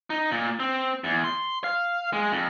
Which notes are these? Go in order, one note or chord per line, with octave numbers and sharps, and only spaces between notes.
D#4
A#2
C4
E2
C6
F5
G#3
F2